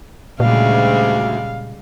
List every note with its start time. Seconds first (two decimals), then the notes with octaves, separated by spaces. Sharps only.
0.40 D2 A#2 C#3 G3 G#3 F5